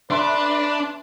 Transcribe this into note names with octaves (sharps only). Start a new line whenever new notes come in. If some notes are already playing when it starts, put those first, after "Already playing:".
D4 B4 E5 C6 F#6